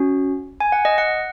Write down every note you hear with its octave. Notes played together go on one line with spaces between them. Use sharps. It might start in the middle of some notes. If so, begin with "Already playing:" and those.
Already playing: C#4 F#4
G#5
F#5
D#5
F#5